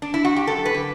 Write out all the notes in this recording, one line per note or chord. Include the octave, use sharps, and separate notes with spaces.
D4
E4
F#4
G4
F#2 A4
B4
D3